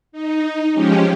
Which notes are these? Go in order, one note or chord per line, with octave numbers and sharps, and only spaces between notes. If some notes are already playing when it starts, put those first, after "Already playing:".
D#4
F3 G#3 C#4 G4